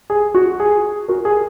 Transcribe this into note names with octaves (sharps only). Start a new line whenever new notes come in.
G#4
F#4
G#4
F#4 A#4
G#4